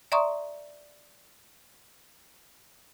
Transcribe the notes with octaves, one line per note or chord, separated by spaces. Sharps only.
D5 E5 A#5 C6 C#6 D#6